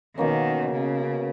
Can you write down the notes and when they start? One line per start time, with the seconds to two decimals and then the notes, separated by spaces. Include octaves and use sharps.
0.17 B2 D#3 A#3 C#4
0.72 C#3